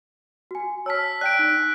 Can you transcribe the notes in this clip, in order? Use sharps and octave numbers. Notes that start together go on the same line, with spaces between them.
F#4 G#5
C#5 A5 E6 F6 B6
D5 G5 F#6 G6 D7
D#4